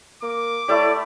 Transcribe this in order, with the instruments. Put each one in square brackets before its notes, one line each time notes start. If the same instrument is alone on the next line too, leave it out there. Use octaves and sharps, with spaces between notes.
[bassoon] A#3 [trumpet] D6
[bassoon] A2 [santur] A3 E4 G4 [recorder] D5